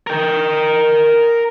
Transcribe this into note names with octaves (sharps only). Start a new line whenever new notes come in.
A#4 G5